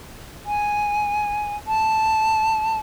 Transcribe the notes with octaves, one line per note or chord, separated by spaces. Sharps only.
G#5
A5